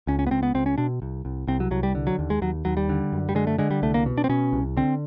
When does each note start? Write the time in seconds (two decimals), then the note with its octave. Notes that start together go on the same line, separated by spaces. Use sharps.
0.07 C#2 C#4
0.19 C#4
0.27 B3
0.31 C#2 C4
0.43 B3
0.54 C#2 C4
0.66 C#4
0.78 B2 D4
1.02 C2
1.25 C2
1.47 C2 C4
1.60 F#3
1.71 C2 F#3
1.83 G3
1.95 D3
2.07 F#3
2.19 D#2
2.30 G#3
2.42 D#2 F#3
2.65 D#2 F#3
2.77 G3
2.89 D3
3.13 F#2
3.29 G3
3.35 D3 G#3
3.47 A3
3.58 D3 G#3
3.71 G3
3.83 C2 A3
3.94 A#3
4.06 B2
4.18 D4
4.24 C4
4.29 B2 C#4
4.53 C2
4.77 D3 C4